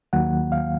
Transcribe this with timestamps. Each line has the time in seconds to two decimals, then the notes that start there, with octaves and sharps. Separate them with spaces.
0.13 D#2 D#3 F#3 A#3 F#5
0.52 F5